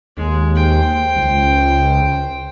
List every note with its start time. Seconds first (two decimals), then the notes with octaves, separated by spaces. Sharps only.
0.17 D#2 G#3
0.56 C5 G5
1.16 C#2